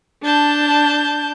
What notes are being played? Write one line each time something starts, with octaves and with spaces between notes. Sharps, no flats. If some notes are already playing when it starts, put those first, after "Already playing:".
D4 A5 G6